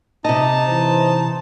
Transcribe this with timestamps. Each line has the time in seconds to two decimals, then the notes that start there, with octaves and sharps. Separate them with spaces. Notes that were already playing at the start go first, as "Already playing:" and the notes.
0.25 C3 D#4 D#5 A5
0.68 E3 C5